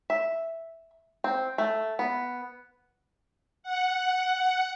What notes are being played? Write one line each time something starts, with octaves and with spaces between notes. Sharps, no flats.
E5
C4
A3
B3
F#5